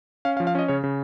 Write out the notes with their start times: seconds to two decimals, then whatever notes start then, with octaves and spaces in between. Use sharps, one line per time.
0.25 C#4 F5
0.37 F5
0.40 F3
0.47 F5
0.55 C#4 D#5
0.68 C#3 C#5
0.84 C#3